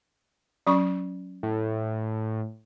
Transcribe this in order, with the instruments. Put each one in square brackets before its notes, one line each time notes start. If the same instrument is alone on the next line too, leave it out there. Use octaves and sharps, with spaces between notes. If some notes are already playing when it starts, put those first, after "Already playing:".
[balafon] F#3 C#4 C#6
[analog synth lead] A2